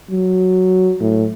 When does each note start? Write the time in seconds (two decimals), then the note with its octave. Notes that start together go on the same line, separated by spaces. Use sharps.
0.11 F#3
1.00 A2